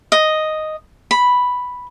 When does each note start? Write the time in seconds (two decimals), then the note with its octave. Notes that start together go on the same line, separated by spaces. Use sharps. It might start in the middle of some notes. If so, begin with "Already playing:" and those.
0.12 D#5
1.11 B5